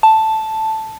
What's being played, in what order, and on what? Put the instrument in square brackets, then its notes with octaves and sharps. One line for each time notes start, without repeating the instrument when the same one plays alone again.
[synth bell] A5